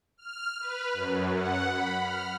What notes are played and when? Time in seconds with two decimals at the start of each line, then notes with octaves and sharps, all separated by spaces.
0.18 F6
0.60 B4
0.94 F#2
1.33 F#5
1.69 B5
2.02 F6